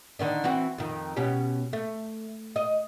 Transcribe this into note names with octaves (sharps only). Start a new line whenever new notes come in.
D3 D#3 D4
E3 C4 F#4
F2 D#3
B2 C#4 G4
A3
D#5